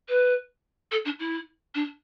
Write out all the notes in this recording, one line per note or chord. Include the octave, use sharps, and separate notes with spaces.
B4
A4
D4
E4
D4